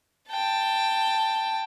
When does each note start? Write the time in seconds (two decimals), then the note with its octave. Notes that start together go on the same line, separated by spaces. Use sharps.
0.30 G5 A5